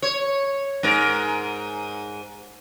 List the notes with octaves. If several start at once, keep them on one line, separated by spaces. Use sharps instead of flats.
C#5
G#2 A#4